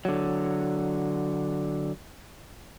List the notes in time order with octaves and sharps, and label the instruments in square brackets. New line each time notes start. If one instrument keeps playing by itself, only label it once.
[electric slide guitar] D3 F#3